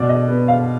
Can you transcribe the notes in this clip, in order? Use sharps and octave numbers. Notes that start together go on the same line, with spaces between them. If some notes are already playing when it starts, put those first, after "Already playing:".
Already playing: B2 D5
D#5
B3
F5